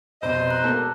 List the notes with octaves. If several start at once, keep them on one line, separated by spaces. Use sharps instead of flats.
F1 B2 C5 D#5
A#5 F#6
E1 A#3 B3 A4